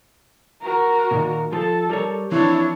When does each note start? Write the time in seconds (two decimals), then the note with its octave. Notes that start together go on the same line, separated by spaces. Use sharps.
0.61 F#4 A#4
1.11 A#2 D#3
1.52 F3 F4 A4
1.89 G3 A#4 C#5
2.32 E3 F3 C4 D4 E4 C#5